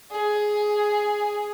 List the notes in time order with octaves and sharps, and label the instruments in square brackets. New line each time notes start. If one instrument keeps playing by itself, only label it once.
[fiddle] G#4